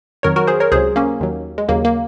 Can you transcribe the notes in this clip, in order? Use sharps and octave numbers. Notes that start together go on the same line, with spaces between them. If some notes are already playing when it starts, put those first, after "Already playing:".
F2 D#3 F#3 A#4 C#5
F#4 A#4
G#4 C5
A#4 C#5
C#2 C3 F#3 G#4 C5
A#3 C#4
D#2 D#3 F#3
G#3
D#2 C#3 F#3 A#3
A#3